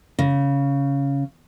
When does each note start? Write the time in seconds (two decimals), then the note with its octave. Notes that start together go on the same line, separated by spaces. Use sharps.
0.19 C#3